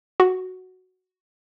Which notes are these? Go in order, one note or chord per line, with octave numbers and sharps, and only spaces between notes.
F#4